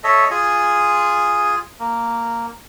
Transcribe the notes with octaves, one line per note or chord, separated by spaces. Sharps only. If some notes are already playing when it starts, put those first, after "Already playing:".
A4 C#5 D#5 E5
F4 G#4 G#5
A#3